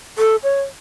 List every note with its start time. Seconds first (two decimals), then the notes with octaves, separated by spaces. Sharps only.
0.18 A4
0.43 C#5